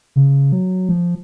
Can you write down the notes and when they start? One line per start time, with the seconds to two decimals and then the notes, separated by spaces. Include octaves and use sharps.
0.16 C#3
0.52 F#3
0.89 F3